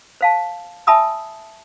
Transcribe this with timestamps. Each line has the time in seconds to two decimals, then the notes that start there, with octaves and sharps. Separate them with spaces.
0.21 C5 F5 A5
0.87 E5 G#5 A5 B5 D#6 E6